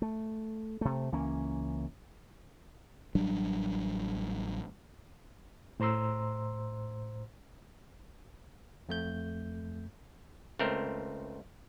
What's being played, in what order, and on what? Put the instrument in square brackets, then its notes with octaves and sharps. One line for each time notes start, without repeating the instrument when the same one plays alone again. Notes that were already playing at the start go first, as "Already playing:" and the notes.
[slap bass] A3
C3 A3
C#2 E3 A#3 C#4
[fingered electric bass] A1 F#3 G3 D4
[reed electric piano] A2 C5 A#5 C6 E6
[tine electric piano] F2 A3 G6
[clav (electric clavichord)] C#2 A3 C4 A#4